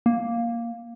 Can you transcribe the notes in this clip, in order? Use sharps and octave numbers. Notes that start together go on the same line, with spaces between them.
A#3